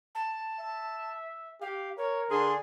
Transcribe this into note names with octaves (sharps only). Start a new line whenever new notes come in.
A5
E5
G4 F5
A#4 C#5
D3 D4 G#4 C6